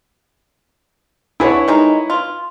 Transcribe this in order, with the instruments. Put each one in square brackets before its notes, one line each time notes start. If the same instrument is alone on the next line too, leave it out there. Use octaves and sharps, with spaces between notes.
[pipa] D3 G#4 A4 [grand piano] E4 B4 C#5
[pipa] D#3 G#3 D#4
F4